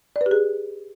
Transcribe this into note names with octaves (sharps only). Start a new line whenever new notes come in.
D5
B4
G4
G#4